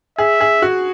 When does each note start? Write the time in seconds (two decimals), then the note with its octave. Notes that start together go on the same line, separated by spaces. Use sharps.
0.18 G#4 E5
0.40 G#4
0.62 F#4